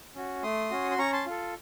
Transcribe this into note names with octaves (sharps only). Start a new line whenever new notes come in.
C#4 F#4
A3 C6 D#6
C#4 F#4
C6
C#4 A#5 C#6
A5 C6
F4 A4